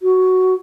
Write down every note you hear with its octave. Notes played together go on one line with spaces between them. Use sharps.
F#4